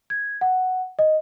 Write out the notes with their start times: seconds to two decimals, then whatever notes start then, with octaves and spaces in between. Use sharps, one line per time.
0.10 G#6
0.41 F#5
0.99 D#5